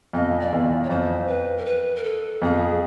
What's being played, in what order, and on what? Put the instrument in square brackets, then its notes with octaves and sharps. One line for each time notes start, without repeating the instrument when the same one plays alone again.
[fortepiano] F2 [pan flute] D#5
[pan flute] D5
[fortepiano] E2
[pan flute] C#5
[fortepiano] F2 [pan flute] C5
[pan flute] B4
A#4
B4
A#4
A4
[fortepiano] F2 [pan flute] G#4